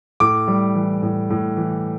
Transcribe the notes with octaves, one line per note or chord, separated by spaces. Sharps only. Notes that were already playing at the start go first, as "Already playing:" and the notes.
A2 D6
G3
E3
A2
A2
E3